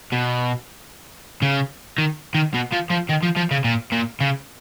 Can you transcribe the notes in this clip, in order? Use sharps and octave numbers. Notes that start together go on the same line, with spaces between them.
B2
C#3
D#3
D#3
B2
F3
F3
D#3
F3
F3
C#3
A#2
A#2
C#3